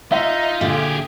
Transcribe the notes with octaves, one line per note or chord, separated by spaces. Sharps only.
D#4 F4 E5
A#2 D3 G4 G#4